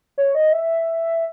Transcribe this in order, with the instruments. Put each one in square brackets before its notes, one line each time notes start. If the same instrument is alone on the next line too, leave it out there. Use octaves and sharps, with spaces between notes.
[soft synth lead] C#5
D#5
E5